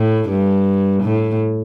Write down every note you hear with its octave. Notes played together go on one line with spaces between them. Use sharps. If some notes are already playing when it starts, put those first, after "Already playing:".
Already playing: A2
G2
A2